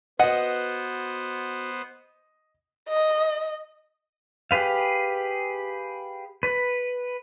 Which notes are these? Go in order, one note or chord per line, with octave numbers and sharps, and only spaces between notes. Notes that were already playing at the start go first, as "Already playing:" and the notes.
B3 F#4 B4 C5 D#5 F#5
D#5
G4 G#4 B4 F5
B4